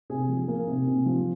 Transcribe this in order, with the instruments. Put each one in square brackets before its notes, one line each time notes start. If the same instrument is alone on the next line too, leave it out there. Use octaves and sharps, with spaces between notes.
[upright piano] C3 G#4
F3
A#3
C3
C3
F3